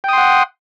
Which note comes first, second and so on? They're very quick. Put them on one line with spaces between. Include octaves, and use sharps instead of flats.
G5 D#6 C6 F#5